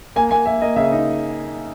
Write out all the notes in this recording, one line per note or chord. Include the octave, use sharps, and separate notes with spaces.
A#3 G#5
A#3 G#5
A#3 E5
A#3 D#5
C#3 E5
D#4